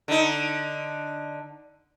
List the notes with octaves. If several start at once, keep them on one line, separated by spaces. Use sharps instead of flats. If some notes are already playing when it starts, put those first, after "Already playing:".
D3 D#4